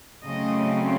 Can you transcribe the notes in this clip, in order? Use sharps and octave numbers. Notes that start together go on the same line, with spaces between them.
C#3 F#3 A3 C4 D#5